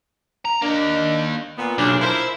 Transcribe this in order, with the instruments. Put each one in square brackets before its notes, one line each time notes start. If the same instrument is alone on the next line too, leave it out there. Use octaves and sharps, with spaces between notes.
[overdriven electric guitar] A#5
[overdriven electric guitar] A#3 D#5 [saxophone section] D4
[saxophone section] A#2 B3
[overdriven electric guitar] B1 [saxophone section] A#2 C#3 D4
[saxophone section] F3 A#4 C5 [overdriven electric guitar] E4 E5